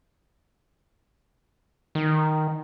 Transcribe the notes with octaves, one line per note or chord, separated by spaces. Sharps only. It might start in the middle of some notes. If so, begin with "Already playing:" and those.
D#3